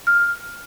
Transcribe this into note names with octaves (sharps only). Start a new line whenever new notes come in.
F6